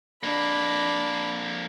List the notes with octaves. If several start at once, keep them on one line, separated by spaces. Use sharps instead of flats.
F2 A#3 D4 B5